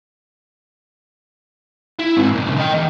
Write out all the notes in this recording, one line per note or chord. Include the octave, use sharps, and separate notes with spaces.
E4
G#2 C4
C#2 F#2
A#2 C#3
D#5 G5
E2